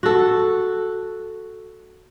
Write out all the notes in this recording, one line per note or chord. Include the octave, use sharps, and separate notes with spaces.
F#4 A4